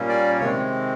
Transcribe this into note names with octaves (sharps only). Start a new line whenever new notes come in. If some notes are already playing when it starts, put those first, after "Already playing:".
Already playing: A#2 G3 A#3 C#4
D5
C3 D#3 G#3 C4 C#5